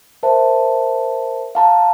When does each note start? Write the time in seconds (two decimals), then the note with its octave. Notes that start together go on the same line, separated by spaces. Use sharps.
0.23 A#4 C5 E5 A5
1.55 F5 A5 A#5